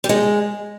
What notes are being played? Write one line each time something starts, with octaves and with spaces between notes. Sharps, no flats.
G3
G#3